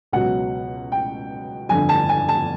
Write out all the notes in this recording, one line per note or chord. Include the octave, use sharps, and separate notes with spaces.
C#2 B2 F#3 F#5
G5
G1 F2 D3 G#5
A5
G#5
A5